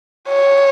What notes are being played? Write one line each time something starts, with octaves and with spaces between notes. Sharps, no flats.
C#5